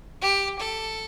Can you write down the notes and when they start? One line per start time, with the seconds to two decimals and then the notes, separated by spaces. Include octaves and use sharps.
0.22 G4
0.59 A4